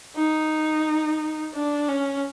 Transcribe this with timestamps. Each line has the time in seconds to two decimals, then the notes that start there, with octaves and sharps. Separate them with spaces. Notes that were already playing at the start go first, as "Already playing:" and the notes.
0.16 D#4
1.54 D4
1.88 C#4